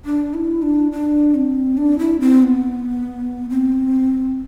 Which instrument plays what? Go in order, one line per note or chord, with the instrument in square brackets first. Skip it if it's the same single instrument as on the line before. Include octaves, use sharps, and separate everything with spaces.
[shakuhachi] D4
E4
D4
D4
C4
D4
E4
C4
B3
C4